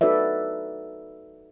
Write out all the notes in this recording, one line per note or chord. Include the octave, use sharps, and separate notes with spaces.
D#4 F#4 A4 B4 D5 E5